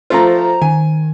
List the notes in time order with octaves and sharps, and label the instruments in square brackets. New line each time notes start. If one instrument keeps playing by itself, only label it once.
[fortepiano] F3 A3 F4 [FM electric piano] C5 A#5
[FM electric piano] D#3 [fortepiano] G#5